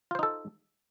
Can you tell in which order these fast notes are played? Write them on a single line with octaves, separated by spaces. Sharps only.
F4 C5 D#4 A4